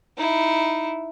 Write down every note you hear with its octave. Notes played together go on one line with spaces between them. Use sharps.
D#4 E4